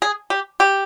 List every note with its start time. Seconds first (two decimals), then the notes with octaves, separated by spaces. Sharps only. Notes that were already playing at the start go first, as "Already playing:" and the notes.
0.02 G#4
0.30 G4
0.60 G4